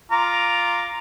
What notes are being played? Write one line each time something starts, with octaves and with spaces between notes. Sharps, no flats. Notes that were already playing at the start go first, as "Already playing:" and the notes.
F4 A#5 D6